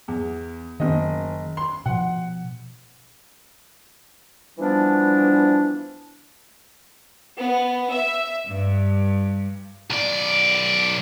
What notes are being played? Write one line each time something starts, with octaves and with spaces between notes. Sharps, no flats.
E2
F#1 D#3 D#5
C6
B2 F3 F#5
E3 F3 G3 B3 D4
B3
E5
G2
B1 D5